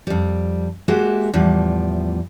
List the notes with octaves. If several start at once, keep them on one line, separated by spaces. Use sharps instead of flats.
F2 G3
G#3 A#3 F#4 G4 E5
E2 A2 F3 G3